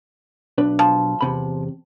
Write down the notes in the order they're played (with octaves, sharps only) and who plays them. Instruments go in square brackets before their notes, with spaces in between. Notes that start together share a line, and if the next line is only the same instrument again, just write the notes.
[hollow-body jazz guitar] B1 D4 B4
[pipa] F3
[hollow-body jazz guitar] E2 C3 B5